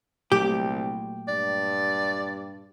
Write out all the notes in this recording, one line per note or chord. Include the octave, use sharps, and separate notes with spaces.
C2 A#2 F#3 A3 G4
G2 D5